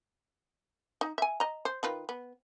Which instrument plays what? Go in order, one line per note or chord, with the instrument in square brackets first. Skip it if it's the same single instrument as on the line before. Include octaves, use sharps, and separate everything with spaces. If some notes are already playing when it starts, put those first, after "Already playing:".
[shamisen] D#4
E5 G#5
D#5 A#5
C5
D#3 F4 B4
B3